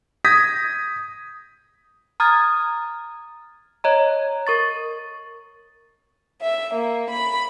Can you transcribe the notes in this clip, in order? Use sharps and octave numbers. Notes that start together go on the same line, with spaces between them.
D#6 G6 G#6 A#6 B6
A#5 D#6 F6 G#6 A6
C#5 D#5 A#5
A#4 C#6 A6
E5
A#3
B5